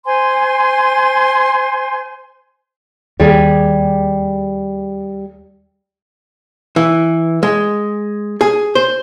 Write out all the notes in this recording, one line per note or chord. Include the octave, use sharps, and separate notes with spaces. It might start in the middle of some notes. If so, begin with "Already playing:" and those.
C5 G#5 C6
D#2 G3 G4 G#4
E3
G#3
G#4
C5